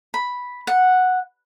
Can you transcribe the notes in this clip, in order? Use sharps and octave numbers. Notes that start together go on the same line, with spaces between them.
B5
F#5